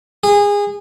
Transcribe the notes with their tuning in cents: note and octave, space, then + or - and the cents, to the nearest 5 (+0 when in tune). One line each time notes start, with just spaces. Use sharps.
G#4 -25